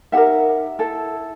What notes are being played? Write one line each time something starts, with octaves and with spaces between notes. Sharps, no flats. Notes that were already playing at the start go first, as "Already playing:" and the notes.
D#4 G4 A#4 E5 F#5
E4 A4